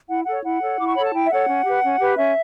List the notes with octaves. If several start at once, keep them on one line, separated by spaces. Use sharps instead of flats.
E4 F#5
A4 C#5 F#5
E4 F#5
A4 C#5
E4 D6
C#6
A4 C#5 B5
A5
E4 G5
E5
A4 C#5 F#5
C#4
G4 B4
C#4
G4 B4
C#4 E5